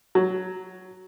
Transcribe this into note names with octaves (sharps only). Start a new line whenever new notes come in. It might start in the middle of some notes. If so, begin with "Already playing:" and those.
F#3